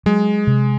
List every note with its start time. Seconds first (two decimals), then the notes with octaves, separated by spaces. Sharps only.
0.06 F#3 G#3
0.47 C3